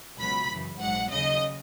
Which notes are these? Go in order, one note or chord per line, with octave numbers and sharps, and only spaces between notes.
C#2 B2 F#3 B5
F#2 C#3 E3
A#1 G#2 F#3 F#5
D#2 C#3 F#3 D#5